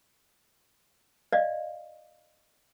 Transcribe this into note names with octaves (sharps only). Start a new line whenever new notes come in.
D5 D#5 F5